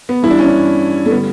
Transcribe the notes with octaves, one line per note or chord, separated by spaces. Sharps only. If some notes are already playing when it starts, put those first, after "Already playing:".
B3
G2 E3 G3 E4
D4
C#4
D4
A3
D3 G3 B3